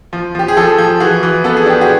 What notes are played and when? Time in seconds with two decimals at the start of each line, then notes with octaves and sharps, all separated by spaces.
0.13 F3
0.35 F3 G4
0.48 G#4
0.57 F3 G4 A4
0.78 F3
1.00 E3 F#4 G#4
1.23 E3
1.44 B3 A4
1.57 G#4
1.66 D4 G4
1.81 F#4 G#4